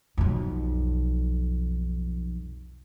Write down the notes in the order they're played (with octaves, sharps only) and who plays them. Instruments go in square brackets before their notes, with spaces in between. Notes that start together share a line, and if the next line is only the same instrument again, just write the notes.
[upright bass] B1 F2